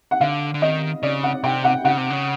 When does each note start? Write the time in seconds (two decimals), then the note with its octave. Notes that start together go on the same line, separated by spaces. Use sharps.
0.11 F#5
0.21 D3 F5
0.54 D3
0.62 D#3 D#5
1.03 C#3 D5
1.23 F#5
1.44 C3 G5
1.64 F#5
1.85 C#3 F#5
1.98 C3
2.10 C#3